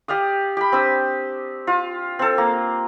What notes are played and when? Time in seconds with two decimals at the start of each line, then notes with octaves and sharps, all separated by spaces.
0.08 G4 D5 F5 D#6
0.57 G4 B5
0.72 C4 D4 D#6 E6
1.67 F4
2.19 C4 A4
2.38 A#3